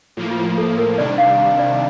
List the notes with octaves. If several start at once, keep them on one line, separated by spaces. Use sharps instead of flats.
A2 F3 A#3 F4
F4
F4
A4
A#4
C3 D#3 G3 D4 D5
F5
D5